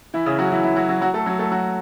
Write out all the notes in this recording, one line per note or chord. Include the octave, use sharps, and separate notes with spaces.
E3 E4
C#3 C#4
F#3 F#4
E3 E4
E3 E4
F#3 F#4
F#3 F#4
F#3 F#4
A3 A4
F#3 F#4
A3 A4
F#3 F#4